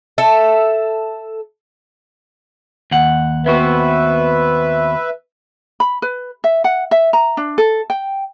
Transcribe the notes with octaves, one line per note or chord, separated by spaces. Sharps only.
A4 E5
D#2 F#5
B3 C4 F#4 B4 E5
B5
B4
E5
F#5
E5
A#5
D4
A4
G5